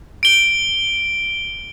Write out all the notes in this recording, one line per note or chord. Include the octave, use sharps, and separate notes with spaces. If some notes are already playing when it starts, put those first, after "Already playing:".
D7 G7